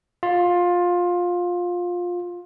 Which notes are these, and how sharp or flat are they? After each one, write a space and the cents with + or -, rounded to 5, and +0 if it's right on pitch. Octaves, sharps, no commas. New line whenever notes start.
F4 +15